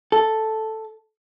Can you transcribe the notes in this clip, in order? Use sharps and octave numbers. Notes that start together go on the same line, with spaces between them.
A4